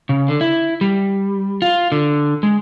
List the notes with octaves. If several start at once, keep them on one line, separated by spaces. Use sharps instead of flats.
C#3
D3
E4
G3
F4
D3
G#3